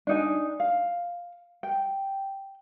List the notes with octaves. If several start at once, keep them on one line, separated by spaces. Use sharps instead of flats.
D4 D#4 G#5
F5
G5